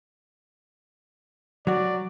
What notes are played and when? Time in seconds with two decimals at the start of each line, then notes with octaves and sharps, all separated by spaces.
1.67 F#3 F#4 D5